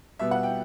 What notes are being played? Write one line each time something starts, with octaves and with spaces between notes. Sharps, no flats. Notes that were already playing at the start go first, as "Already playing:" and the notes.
B2 G3 B3 E5
F#5
G5